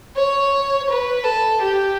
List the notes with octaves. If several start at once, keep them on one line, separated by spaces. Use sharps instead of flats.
C#5
B4
A4
G4